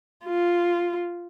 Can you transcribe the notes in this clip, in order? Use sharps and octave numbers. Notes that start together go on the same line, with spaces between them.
F4